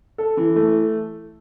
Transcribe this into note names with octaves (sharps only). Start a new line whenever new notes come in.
A4
E3
A3